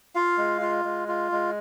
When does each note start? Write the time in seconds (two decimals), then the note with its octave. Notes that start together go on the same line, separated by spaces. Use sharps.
0.15 F4 F5
0.38 G#3
0.62 F4
0.85 G#3
1.08 F4
1.32 G#3